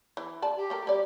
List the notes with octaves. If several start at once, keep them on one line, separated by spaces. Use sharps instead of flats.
E3
D5 A5
G4
A3 A4 A#4
G3 D5